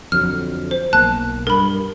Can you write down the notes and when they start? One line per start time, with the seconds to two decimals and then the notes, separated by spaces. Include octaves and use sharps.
0.12 F2 D3 F#3 F6
0.71 C5
0.93 B1 A#3 A5 F#6
1.47 G2 A#4 B5